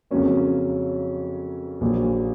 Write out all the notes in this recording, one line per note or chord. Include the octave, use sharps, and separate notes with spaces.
F2 C#3 F#3 A#3 C#4
A#1 A#2 F#3